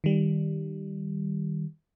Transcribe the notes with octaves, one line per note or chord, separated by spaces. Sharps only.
D#3 G3